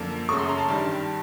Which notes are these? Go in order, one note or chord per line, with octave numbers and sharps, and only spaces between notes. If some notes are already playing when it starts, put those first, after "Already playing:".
Already playing: F#2 D3 F3 A#3
F#2 C#3 F#3 A3 C#6
C6
A#5
A5
G2 D#3 G3